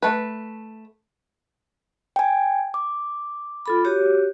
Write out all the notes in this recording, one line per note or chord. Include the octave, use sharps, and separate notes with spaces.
A3 B4
G5 G#5
D6
F4 A4 B5
F#4 G4 C#5